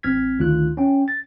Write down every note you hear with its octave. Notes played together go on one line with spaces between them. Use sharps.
A1 C4 F6 G#6 B6
D2 D#3 F4 F#6
C#4 G5
A6